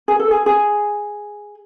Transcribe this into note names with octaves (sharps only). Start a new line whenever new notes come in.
G#4
A4
G#4
G#4